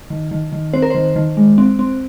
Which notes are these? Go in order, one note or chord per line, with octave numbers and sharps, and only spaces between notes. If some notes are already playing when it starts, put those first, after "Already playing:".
D#3
D#3
D#3
C4 C5
A#4
D#3 C5
D#3
G#3
C4
C4